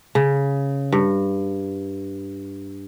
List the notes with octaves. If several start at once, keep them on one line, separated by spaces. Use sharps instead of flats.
C#3
G2